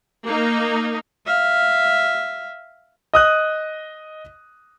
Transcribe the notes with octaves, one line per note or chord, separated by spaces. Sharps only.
A#3 D#4
E5 F5
D#5 D#6 F#6